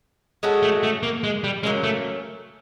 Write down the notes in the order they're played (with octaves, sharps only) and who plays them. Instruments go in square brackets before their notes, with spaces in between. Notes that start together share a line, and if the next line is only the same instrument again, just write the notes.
[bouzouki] G#3 C#4 F#4 A4
[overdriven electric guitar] A3
A3
A#3
G#3
G3
[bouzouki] F#3 A#3 C#4 [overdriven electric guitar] G#3
[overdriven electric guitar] A3